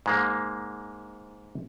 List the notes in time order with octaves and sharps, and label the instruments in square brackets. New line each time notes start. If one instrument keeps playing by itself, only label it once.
[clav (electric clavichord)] G#2 G#3 A#3